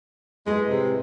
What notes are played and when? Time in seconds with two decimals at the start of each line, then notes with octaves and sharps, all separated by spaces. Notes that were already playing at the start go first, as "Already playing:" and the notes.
0.46 A2 G#3 G#4 B4
0.68 C3